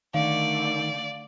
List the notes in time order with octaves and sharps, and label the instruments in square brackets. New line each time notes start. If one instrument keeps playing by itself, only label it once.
[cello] D3 A3 [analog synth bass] D#3 [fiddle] D5 [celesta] F5